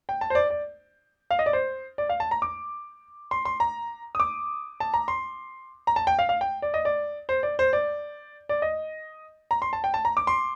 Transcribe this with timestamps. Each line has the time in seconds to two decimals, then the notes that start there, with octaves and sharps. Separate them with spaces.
0.09 G5
0.21 A5
0.30 C5
0.35 D5
0.50 D5
1.31 F5
1.39 D#5
1.46 D5
1.53 C5
1.98 D5
2.09 F5
2.20 A5
2.31 A#5
2.42 D6
3.31 C6
3.45 C6
3.60 A#5
4.15 D#6
4.20 D6
4.80 A5
4.94 A#5
5.08 C6
5.87 A#5
5.96 A5
6.07 G5
6.19 F5
6.29 F5
6.41 G5
6.62 D5
6.74 D#5
6.85 D5
7.29 C5
7.43 D5
7.59 C5
7.73 D5
8.49 D5
8.62 D#5
9.51 A#5
9.62 C6
9.73 A5
9.84 G5
9.94 A5
10.05 A#5
10.17 D6
10.27 C6